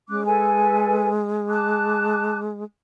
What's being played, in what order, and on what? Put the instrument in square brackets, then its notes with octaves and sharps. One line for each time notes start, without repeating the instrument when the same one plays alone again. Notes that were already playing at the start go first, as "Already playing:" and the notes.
[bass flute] G#3 [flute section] C#4 D6 F#6
[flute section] A4 B4 G#5
A5 D6 F#6